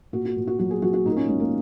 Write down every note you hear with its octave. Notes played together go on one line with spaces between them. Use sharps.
A#2 F#4
F#4
A#2
F#4
F#3 F#4
G#4
F#3 F#4
F#4
A#2 D#4
A#3
C#4
G#3 C#4
A#3